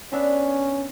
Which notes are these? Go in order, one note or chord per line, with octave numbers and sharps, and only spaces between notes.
B3 C#4 D4 E5